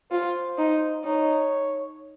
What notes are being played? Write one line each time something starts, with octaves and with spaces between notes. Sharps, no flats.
F4 C5
D#4
D#4 C#5